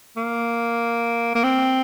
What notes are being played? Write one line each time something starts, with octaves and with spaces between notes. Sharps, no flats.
A#3
A#3
C4